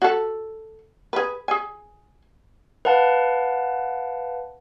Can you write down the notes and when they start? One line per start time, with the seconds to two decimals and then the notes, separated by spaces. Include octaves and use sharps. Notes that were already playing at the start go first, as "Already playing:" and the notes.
0.02 F#4 A4
1.13 G#4 B4
1.48 G#4 G#5
2.85 B4 F5 F#5 A5